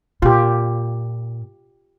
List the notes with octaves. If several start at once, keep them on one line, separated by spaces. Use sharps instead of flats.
A#2 F4 G4